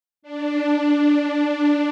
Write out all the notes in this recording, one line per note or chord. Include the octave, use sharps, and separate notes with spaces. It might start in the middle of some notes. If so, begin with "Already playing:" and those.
D4